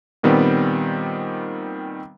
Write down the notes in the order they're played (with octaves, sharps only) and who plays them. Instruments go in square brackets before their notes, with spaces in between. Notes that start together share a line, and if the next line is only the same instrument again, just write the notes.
[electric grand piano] A#2 D#3 G3 B3 C4